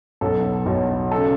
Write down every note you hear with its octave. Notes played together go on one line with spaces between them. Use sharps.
B1 B2 F#3 A4
B1 B2 F#3
C#3 A4